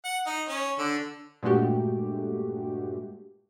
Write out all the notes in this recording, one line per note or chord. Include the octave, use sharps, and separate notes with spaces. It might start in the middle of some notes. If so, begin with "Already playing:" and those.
F#5
D#4
C#4
D3
G2 A#2 G#3 A3 F#4 G4